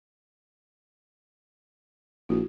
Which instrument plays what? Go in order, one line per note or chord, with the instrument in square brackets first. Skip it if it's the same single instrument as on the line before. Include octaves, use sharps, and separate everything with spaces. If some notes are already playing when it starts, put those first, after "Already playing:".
[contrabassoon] A#1 [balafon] E4 F#4